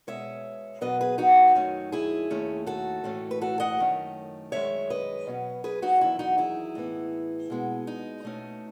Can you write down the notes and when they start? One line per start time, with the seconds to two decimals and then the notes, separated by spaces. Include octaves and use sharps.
0.07 B2 G#3 C#4 C#5 E5
0.81 B2 F#3 B3 B4 D#5
1.01 G#4 B4
1.18 D#4 F#4
1.55 F#2 D#3 A3 C#4
1.92 E4 G#4
2.30 D#2 D#3 A3 C#4
2.66 F#4 A4
3.04 A2 E3 A3 C#4
3.31 B4
3.41 F#4 A4
3.60 D#5 F#5
3.78 F#2 D#3 A3 C#4
4.52 F#2 D#3 G#3 C#5 E5
4.90 B4 D#5
5.27 B2 F#3 C#4
5.64 G#4 B4
5.82 D#4 F#4
6.01 E2 D#3 F#3 E4
6.19 D#4 F#4
6.38 E4 G#4
6.75 A2 E3 B3
7.50 B2 G#3 B3
7.87 D#4
8.24 B2 A3 C#4